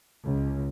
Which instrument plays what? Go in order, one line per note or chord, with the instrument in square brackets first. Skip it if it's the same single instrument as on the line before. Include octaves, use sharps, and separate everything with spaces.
[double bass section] C#2